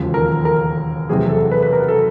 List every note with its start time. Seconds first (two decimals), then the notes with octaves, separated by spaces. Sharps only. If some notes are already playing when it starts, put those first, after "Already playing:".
Already playing: E1 D#2 C#3 F3
0.14 A#4
0.45 A#4
1.09 F#1 E2 C3 G#4
1.29 A4
1.52 B4
1.63 B4
1.73 A#4
1.88 A4